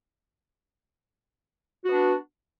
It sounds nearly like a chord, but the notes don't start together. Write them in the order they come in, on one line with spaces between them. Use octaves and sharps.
F#4 B3 D4